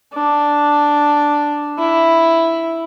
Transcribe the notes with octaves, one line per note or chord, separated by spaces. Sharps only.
D4
E4